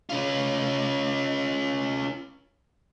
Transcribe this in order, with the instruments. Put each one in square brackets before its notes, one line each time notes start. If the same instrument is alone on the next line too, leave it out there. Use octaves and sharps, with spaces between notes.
[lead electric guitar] C#4 F4